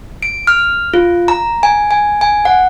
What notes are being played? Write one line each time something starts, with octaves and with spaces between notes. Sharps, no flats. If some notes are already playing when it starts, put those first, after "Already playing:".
D7
F6
F4
A#5
G#5
G#5
G#5
F#5